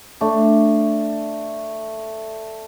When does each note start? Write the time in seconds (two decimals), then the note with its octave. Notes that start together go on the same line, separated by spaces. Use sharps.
0.21 A3 D4